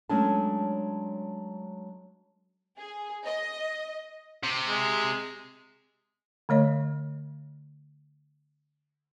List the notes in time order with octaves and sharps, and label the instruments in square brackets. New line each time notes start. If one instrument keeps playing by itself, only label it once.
[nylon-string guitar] F#3 G#3 A3 C#4 D4 A5
[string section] G#4
D#5
[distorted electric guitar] C3
[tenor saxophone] G#3
[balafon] D3 A3 C#5 D#5